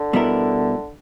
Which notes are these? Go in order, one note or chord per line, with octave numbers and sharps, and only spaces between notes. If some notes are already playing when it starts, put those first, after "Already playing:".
Already playing: D3
B2 G3 B3 E4 A#4